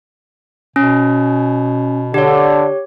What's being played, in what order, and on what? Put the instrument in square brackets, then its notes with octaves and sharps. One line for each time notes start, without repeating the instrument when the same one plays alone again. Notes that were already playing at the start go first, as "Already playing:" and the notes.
[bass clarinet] B2 [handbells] C#4
[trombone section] D3 [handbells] G4 C#5